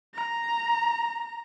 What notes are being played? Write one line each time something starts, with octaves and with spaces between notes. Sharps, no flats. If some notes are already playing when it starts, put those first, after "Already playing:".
A#5